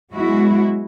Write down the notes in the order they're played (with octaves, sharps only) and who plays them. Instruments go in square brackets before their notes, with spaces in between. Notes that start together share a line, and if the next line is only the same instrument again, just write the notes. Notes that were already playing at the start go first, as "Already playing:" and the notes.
[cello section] F#3 G#3 B3 E4 F#4